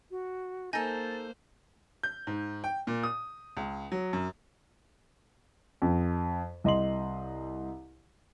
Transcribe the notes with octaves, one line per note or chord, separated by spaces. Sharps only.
F#4
A#3 D#4 A4 C5 G#5 G6 A6 A#6
G6
G#2
G5
A#2
D#6
C#2
F#3
F#2
F2
C2 D#5 C6 F#7